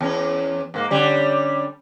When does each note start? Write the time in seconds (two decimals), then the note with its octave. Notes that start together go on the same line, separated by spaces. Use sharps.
0.01 E2 C#4
0.74 G#2 A#3
0.90 D3 G3 C#4